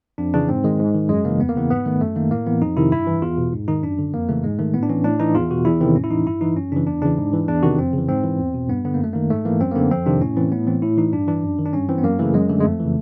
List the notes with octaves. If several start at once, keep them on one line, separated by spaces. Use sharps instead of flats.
F2 D4
C#3 E3 D4
G#2 C4
D#3 G#3
G#2
D#3
F#2 G#3
C#3 E3 A#3
E2 B3
A#3
C#3 E3 B3
G#2 B3
D#3 A3
F#2 A3
D#3 A#3
A2 A#3
E3 B3
F2 D#4
C3 D#3 E4
G2 E4
E3
E2 F4
B2
G#2
D#3 D#4
F#2 D4
D3
F2 A#3
C#3 E3 A3
G#2 G#3
D#3 A3
A2 B3
D4
E3 C#4
A2 D4
E3 D#4
E2 F4
B2 F#4
E2 E4
C3 D#3 C4
A2 C#4
E4
E3 D#4
G2 E4
E3 D#4
F#2 C#4
C#3 E3 D4
E2 D4
C#3 E3 D4
G#2
E3
E2 D4
C3 D#3 F#4
F2 C4
C#3 E3
G#2 C4
E3
E2
B2
G2 B3
D3 B3
A#3
F#2 A3
D#3 A#3
G#2 A3
E3 A#3
F#2 C4
A#3
D3 B3
F2 C4
C3 D#3 D4
A2 C#4
E3 C4
A2 B3
E3 C4
A2 E4
E3 D#4
G2 D4
E3 D4
F#2
D#3
D4
G2 C#4
E3 C4
B3
F#2 A#3
C#3 E3 A3
F#2 G#3
D3 A3
G#3
F2 A3
C#3 E3